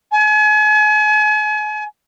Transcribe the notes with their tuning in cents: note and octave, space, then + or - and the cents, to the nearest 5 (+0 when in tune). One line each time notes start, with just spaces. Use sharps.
G#5 +40